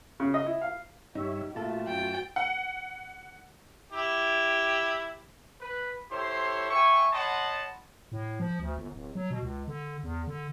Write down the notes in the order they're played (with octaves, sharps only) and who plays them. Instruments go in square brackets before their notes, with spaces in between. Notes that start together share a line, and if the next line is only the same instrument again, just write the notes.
[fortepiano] C#3
D#5
E4
F5
[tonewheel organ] G2 C#5 E5 [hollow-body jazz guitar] D#4 [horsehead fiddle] G4
[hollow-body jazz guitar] A#2 A4 [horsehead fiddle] A3 F4 [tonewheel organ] F#4 A5
[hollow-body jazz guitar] F#2 [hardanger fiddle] G5
[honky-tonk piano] F#5
[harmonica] E4 G4
[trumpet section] B4
E4 G4 A4 C5 C#5 C6
E5 G5 G#5 C#6
C#5 D#5 F#5 A5 B5 C6
[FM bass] A2
F3
D2
G1
D1
F#3
B2
C#2
D3
E2
D3